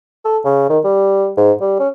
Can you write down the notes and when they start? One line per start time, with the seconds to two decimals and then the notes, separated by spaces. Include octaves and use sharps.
0.25 A4
0.45 C#3
0.69 D#3
0.84 G3
1.37 G#2
1.61 G3
1.79 C#4